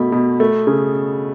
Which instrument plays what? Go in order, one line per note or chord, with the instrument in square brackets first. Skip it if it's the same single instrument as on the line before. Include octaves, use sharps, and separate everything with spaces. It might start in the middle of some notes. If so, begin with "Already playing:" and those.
Already playing: [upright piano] B2 A3 B5
B2
A3
C#3